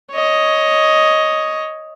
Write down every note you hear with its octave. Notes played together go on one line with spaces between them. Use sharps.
C#5 D#5